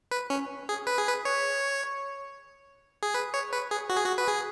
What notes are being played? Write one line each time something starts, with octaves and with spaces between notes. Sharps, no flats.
B4
C#4
G#4
B4
G#4
B4
C#5
G#4
B4
C#5
B4
G#4
F#4
G#4
F#4
B4
G#4